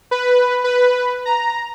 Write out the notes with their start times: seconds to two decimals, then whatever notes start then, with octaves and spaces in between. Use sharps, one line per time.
0.11 B4
0.64 B4
1.25 A#5